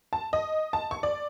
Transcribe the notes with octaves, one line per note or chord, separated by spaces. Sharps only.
A5
D#5
A5
C#6
D5